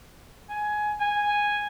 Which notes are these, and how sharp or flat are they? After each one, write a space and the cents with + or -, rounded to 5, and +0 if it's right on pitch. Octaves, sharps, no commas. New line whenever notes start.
G#5 +15
G#5 -5